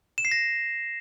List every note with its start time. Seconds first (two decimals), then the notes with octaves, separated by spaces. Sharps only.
0.18 E7
0.25 C7
0.31 A#6